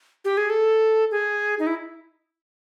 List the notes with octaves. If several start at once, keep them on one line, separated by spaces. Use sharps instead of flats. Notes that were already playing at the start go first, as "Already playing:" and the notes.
G4
G#4
A4
G#4
D#4
E4